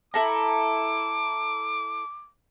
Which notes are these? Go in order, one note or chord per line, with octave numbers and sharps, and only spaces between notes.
E4 A4 A#5 D6